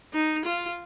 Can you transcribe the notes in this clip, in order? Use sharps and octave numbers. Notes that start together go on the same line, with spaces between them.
D#4
F4